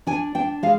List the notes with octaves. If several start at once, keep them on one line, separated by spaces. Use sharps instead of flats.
D4 G#5
D4 G5
G#3 F5